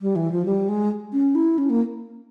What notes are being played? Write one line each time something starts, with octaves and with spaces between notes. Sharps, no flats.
G3
E3
F3
G3
G#3
C#4
E4
C#4
A#3